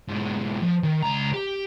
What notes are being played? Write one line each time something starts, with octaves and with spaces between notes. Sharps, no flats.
G#2 B2
F3
D#3
C#2 A#5
G4